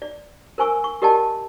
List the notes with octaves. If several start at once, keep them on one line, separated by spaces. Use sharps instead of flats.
D5
A#4 C5 G#5 C#6 E6
C#6
G4 A#4 D5 D#5 G5 A5